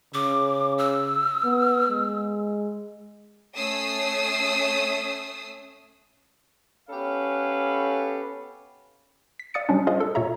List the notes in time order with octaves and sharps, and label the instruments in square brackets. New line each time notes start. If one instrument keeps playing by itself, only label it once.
[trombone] C#3 [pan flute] D6
[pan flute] E6
[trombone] B3
G#3
[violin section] A3 C#4 D#6 E6 C7
[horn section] B3 C#4 G4 A4 B4 F5
[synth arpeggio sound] B6
D5 F5 D#6 A6 C#7
F#3 G3 C#4 D4
F4 G#4 C5 D#5 F5 D#6
A4
A#2 C#5 E5 A#5